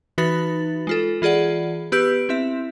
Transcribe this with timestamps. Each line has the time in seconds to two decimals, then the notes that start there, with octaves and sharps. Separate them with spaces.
0.18 E3 D#4 F#4 B4 B5 A6
0.87 G#3 F4 A4
1.22 E3 F4 G#4 D5 F#5
1.92 B3 G4 B4 E6 G6 D7
2.29 C4 E4 E5